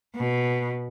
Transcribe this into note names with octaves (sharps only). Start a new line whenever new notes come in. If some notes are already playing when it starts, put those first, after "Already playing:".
B2